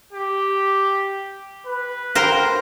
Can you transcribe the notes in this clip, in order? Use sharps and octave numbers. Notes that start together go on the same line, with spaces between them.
G4
B4
A#4 C5 G5